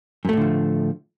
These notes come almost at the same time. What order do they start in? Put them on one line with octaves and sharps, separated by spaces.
F#2 A3 A2 D3 F3